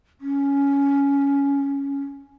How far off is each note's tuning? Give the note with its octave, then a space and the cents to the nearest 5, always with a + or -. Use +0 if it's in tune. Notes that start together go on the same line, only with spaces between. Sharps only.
C#4 +10